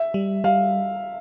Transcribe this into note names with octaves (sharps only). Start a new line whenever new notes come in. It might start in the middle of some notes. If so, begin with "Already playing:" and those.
Already playing: E5
G3
G3 F5